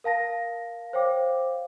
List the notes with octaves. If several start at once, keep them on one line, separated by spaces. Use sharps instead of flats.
A#4 F5 A5 A#6
C5 C#5 F5 G5 D6